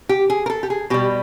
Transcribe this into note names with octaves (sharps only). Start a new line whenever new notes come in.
G4
G#4
A#4
A4
G4
G#4
B2 G3 G4